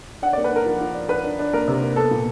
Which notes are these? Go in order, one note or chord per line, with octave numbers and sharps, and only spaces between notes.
D4 F#5
A#3 D5
B4
D4 A#4
F3
F3
D4
D4 B4
D4
D4
A#3 A#4
C3
A#3
B3 A4
A#2